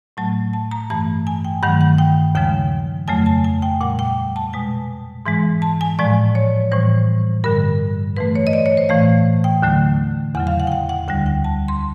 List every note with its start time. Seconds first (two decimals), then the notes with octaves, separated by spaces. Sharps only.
0.17 A2 F#3 A3 A5
0.53 A5
0.71 A#5
0.90 G2 E3 A3 A5
1.27 G#5
1.45 G5
1.63 G2 D#3 F#3 A3 F#5
1.81 F#5
1.98 G5
2.35 D#2 C#3 F3 G#3 G5
3.08 F2 C#3 F#3 A3 G#5
3.26 A5
3.44 G#5
3.62 G5
3.81 A#2 G3 F#5
3.99 G5
4.36 A5
4.53 B2 G#3 G#5
5.26 G#2 E3 G#3
5.62 A5
5.81 G#5
5.99 A2 F3 G#3 D5
6.35 C#5
6.71 A2 E3 G3 C5
7.44 G2 D3 G3 A#4
8.17 G#2 E3 A3 B4
8.35 C#5
8.47 D#5
8.53 D5
8.66 C#5
8.77 C5
8.89 A2 E3 A3 F5
9.44 G5
9.62 D#2 D3 F#3 A3
10.35 E2 C#3 F#3 F#5
10.47 F5
10.60 F#5
10.67 G5
10.72 F#5
10.89 F#5
11.08 D2 D3 G3 G5
11.26 G5
11.44 A5
11.68 C6